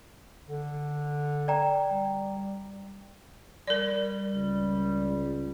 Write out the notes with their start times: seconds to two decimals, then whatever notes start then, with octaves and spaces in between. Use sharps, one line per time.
0.48 D3
1.48 D5 G5 A#5
1.91 G3
3.67 G3 A#4 D5
4.35 C#2